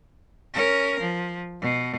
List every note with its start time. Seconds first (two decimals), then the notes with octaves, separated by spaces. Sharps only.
0.54 C#4 A#4
1.00 F3
1.61 B2